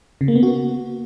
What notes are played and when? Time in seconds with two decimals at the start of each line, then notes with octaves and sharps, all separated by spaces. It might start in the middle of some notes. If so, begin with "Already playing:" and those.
0.21 C#3
0.28 A#3
0.35 B3
0.43 F#4